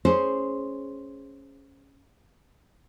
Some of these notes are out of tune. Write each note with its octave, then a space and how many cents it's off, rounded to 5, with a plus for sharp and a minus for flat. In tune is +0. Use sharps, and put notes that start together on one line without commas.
C#4 +0 G#4 +0 C5 +0